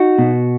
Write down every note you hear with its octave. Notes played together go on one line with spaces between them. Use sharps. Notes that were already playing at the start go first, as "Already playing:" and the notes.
Already playing: D#4 F#4
B2